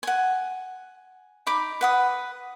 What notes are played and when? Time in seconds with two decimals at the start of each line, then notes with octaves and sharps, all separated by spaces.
0.03 F#5 G#5
1.47 D#4 B5 D6
1.81 B4 F#5 D#6